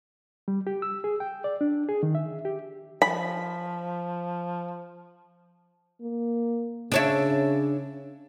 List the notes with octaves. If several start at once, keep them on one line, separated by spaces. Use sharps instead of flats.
G3
G4
E6
G#4
G5
D5
D4
G#4
D#3
E5
G4
F3 B5
A#3
C#3 D4 C#5 E5